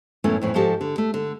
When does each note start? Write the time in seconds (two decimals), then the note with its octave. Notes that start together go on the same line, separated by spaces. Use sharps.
0.24 F#2 A2 E3 A3 B3 C#4
0.41 F2 A2 E3
0.54 G#2 F3 D#4 F#4 G4 A4
0.81 D3
0.98 A3
1.14 D3